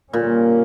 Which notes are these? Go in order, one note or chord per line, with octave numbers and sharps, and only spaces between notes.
A#2 D3 G3 A#3 C#4